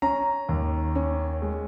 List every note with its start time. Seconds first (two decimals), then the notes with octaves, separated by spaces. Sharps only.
0.02 C#4 A#5
0.49 D#2
0.95 C#4
1.42 G#3